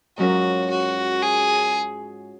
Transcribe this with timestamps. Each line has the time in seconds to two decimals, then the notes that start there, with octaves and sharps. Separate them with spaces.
0.18 G#2 F#3 C#4 F4 F#4 A#4
0.71 F#4
1.23 G#4